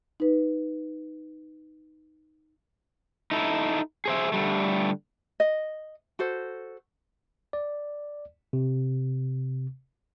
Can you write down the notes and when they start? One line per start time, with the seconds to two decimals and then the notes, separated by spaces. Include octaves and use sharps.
0.20 D#4 B4
3.31 D#4 E4 A4
4.06 G#4 C5 E5
4.32 D3 G3 A3
5.40 D#5
6.19 F#4 A4 C5
7.53 D5
8.53 C3